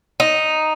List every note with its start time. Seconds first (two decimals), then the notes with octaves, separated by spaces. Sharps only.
0.20 D#4